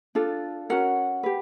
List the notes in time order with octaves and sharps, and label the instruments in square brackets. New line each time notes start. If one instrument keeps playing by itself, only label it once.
[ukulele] D4 F4 A4
C#4 F#4 A#4 F#5
G4 B4